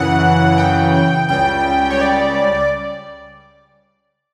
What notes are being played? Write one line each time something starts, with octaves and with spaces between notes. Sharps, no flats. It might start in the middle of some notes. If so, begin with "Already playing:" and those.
Already playing: F#2 C#3 E3 F#5
G5
C#2 C#3 G3 G5
C#5
D5